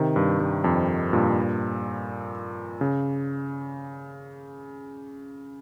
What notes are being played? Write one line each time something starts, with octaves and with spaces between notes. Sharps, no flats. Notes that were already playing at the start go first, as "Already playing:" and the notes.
Already playing: C3 D#3
G2
G2
F2
G2 A#2
C#3